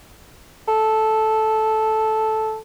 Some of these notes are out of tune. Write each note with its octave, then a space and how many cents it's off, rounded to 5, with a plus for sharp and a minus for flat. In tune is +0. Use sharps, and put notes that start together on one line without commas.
A4 -10